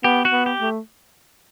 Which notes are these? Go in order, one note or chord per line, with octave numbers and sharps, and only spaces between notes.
B3 G4
F#4
B3
G4
A3